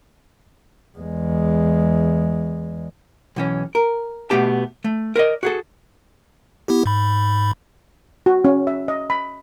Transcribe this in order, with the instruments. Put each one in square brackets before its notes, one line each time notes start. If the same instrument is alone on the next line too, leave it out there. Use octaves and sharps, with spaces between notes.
[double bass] E2 G#3
[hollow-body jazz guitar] B1 E3 C#4
A#4
B2 E3 A3 B3 G4 A5
A3
A#4 B4 D5 D#5
F#4 G#4 A4
[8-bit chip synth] B3 E4 G4
G#2 B5
[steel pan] F#4
C#4
E5
D#5
B5